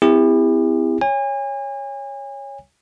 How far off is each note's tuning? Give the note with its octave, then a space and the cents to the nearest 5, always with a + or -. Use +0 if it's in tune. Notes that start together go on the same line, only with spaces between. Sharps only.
C4 -40 E4 +0 G4 +45
C#5 +0 G#5 -35